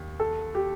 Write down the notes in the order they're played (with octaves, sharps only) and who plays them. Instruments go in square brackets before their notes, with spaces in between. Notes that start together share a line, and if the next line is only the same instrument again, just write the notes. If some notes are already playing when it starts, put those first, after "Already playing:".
Already playing: [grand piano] D#2
[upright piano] A4
G4